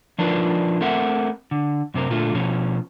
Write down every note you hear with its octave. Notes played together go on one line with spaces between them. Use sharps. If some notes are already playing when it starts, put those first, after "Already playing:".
F3 D4 D#4 F4 A#4 B4
A3 C4 A#4 E5 F#5
D3
F#2 C3 C4 A#4
A#2 D3 A3 F4
B2 F3 C#4